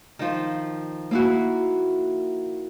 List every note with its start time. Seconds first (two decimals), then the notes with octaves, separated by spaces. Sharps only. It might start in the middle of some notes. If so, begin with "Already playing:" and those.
0.19 D#3 F3
1.11 A#3 E4 F#4